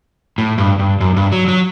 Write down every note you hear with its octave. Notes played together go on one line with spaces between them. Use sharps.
A2
G2
G2
F#2
G2
F#3
F#3